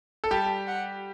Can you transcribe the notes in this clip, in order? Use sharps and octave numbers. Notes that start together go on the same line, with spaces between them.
A4
G3 G4 A5
F#5